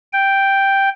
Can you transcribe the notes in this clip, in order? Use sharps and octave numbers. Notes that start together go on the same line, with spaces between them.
G5